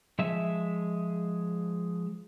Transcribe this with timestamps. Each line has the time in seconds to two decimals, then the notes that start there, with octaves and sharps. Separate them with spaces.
0.19 F3 G#3 E5